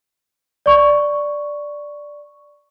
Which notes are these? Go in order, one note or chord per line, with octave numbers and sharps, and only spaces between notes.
D5 C#6